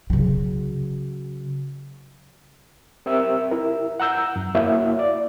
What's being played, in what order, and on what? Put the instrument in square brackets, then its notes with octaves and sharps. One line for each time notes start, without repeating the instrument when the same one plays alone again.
[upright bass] C#3 F#3
[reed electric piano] C4 G4 A#4 E5 E6
E4 A#4
F#5 A#5 E6 G6
F#2
A#3 E4 F#4 C#5 E5 F5
D5